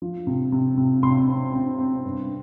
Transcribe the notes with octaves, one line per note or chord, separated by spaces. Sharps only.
F3
C3
C3
C3
C3 C6
C4
C4
C4
G2